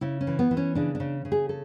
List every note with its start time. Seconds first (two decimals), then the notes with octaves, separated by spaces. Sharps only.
0.01 C#3 E4
0.21 C#4
0.27 E3
0.39 B3
0.51 E3
0.57 C#4
0.75 C#3 D4
0.95 D4
1.00 C#3
1.25 C#3
1.32 G#4
1.49 A4